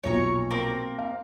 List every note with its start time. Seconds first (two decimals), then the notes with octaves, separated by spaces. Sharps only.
0.04 B1 A#2 F3 C#5 A#5 C#6
0.51 A#3 C4 A#4
0.99 F5